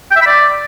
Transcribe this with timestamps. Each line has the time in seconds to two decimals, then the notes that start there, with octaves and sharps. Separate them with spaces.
0.11 G5
0.16 E5
0.21 B5
0.26 D5